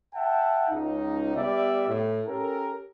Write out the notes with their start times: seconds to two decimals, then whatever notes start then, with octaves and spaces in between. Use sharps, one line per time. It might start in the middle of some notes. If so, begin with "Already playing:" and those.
0.14 E5 F#5 G5 A5
0.69 C#2 D#4
1.36 G3 B3 D5 E5
1.88 A2
2.26 C#4 G4 A4 A#4